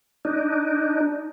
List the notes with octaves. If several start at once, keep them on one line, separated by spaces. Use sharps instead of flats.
D4 D#4